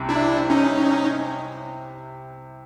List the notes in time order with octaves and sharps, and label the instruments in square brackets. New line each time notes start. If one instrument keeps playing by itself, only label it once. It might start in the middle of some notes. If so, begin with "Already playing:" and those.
Already playing: [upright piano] C2 C3
[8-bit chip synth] D4 E4
C#4 D#4